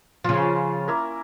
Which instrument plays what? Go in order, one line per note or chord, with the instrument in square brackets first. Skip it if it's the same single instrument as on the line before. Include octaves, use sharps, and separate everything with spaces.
[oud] C#3 F3 [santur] F4
[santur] C#4
A#3 E4 A#4